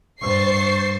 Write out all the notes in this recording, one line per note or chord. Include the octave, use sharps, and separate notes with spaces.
G2 C5 C#6 A6 C7